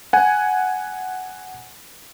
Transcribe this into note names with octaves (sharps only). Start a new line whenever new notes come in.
F#5 G#5